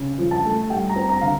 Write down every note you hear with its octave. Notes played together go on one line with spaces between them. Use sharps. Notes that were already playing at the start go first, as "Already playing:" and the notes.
Already playing: C#3 C#4
F3
A5
A3
G3 G5
A#5
C4
A#5
D3 F5